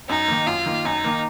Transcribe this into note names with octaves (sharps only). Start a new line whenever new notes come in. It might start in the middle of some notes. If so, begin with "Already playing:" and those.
F#2 D#4
D#3 A#3
F#2 F4
D#3 A#3
F#2 D#4
D#3 A#3